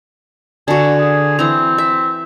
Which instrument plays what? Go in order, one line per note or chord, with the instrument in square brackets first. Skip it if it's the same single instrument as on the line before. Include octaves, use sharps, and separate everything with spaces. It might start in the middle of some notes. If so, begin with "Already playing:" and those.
[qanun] D3 F#4 [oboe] G#5
[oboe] G#4
[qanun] E3 A#5 [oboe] C4
[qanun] E5